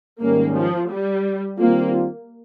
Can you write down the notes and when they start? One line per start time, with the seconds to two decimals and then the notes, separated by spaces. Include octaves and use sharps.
0.21 G#2 D#3 G3 A#3 C#4
0.56 F3
0.90 G3
1.59 D#3 G3 A#3 C4 F4